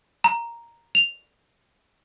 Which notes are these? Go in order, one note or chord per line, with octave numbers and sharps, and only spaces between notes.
A#5
F7